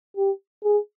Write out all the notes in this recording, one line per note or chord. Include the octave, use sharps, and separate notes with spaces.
G4
G#4